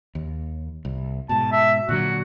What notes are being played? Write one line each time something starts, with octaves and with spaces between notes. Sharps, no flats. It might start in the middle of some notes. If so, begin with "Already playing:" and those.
D#2
C2
G#2 B2 A5
E5
A#2 D3 F#3 F#4